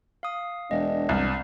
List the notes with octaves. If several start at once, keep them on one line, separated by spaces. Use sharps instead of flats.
F5 D#6
E1 D4 D#5
C2 D5 F6 G6